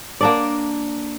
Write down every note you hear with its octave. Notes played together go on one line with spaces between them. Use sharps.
A#3 D4 D5